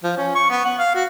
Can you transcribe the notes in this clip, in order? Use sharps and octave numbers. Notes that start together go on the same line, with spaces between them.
F3
C#4
C#6
B3
F#5
F5
F#4